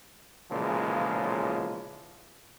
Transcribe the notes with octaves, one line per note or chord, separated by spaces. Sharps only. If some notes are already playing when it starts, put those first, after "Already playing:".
B1 A#2 C#3 E3 F3 G#3